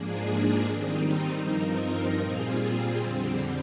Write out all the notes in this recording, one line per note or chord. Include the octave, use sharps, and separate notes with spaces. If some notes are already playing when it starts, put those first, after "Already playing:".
Already playing: G#2 F3 A#3 D4 G#4
D#3 G3 C4 D#4
G2 F3 C4 D#4 A#4
A#2 G3 C4 F4 G#4
F2 D3 G3 C4